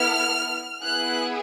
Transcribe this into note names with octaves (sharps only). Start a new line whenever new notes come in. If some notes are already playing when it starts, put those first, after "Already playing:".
Already playing: B3 E4 A4 F6
B3 E4 G#4 F#6